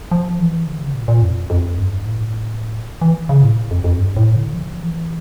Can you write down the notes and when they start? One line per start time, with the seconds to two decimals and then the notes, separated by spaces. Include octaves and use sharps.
0.11 F3
0.39 E3
0.67 D3
0.81 C#3
0.94 A#2
1.08 A#2
1.22 F2
1.50 F2
1.78 G2
2.05 A2
3.01 E3
3.29 C#3
3.43 A2
3.71 F2
3.84 F2
3.98 G2
4.17 A2
4.36 D3
4.54 F3
4.81 E3